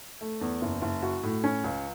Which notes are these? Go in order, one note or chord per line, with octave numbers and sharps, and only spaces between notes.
A3
E2
F#1
F#1
F#4
A2
C#4
C#2